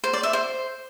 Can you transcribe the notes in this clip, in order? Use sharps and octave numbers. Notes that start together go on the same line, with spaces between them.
C5
D5
E5
C5